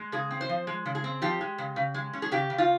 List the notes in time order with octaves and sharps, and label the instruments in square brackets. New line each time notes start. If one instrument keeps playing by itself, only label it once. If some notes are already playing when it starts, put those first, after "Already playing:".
Already playing: [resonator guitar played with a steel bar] G#3
C#3 G#4
C4
C5
F3
G#3
C#3
G#4
C4
F3 G4
G#3
C#3
C#3
G#3
C#4
G#4
C#3 G4
C#3
F4